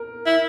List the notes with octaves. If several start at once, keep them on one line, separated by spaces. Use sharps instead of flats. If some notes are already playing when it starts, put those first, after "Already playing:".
Already playing: A#4
E4